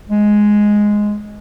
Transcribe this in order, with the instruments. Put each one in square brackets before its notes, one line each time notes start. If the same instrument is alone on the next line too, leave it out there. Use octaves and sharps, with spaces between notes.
[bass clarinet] G#3